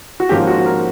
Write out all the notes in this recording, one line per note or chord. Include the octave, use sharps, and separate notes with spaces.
F#4
G#2 F3 A#3 C#4 G4
F#4
A#4